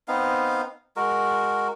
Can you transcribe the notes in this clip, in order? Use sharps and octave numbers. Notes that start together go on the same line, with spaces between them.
B3 C4 D#4 F5
G#3 F#4 A#4